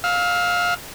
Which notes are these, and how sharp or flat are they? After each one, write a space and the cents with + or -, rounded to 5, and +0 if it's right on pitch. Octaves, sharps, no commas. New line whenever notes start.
F5 +15 E6 -20